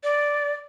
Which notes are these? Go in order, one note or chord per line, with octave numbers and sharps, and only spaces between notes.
D5